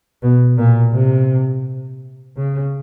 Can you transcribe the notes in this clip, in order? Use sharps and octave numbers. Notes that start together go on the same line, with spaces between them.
B2
A#2
C3
C#3